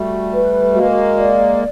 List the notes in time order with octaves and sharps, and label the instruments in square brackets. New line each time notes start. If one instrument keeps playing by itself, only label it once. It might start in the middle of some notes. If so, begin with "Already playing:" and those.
Already playing: [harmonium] G3 A3 [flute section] F#4
[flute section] B4
[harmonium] G#3 A#3 [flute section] F#4
[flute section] D5